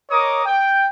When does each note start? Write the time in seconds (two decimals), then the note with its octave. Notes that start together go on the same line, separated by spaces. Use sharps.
0.10 A#4 C#5 D#5 D6 D#6
0.46 G5